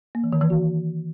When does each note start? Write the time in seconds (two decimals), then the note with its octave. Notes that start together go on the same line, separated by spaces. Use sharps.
0.15 A#3
0.24 E3
0.33 D#3
0.41 E3
0.50 F#4